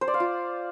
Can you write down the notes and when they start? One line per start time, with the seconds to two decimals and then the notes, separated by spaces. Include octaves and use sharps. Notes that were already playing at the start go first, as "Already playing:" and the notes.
0.01 C5
0.08 D5
0.14 F5
0.20 F4